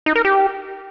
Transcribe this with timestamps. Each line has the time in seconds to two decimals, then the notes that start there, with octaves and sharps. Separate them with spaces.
0.06 D#4
0.15 A#4
0.25 G4